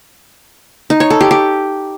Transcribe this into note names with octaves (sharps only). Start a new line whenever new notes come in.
D#4
C#5
A4
G4
G4